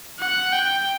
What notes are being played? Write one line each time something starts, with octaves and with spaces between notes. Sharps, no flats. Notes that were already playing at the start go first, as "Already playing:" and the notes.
F#5
G5